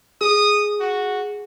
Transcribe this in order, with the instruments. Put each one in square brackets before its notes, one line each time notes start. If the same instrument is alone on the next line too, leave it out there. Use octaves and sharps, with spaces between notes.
[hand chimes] G#4 [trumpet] D#6
[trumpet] F#4